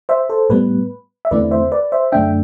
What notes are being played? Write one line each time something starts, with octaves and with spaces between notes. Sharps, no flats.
C5 E5
A4 C5
A2 G3 B3 B4
E5
E2 D3 A3 C4 E4 B4 D5
C5 E5
B4 D5
C5 E5
F#2 D3 A3 D4 E5 G5